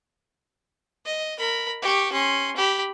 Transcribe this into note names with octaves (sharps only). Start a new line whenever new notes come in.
D#5
A#4 B5
G4 C#6
C#4 C6
G4 B5